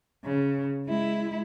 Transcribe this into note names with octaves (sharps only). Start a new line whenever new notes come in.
C#3
G#3 E4